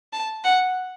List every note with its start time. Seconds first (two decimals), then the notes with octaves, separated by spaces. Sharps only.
0.13 A5
0.44 F#5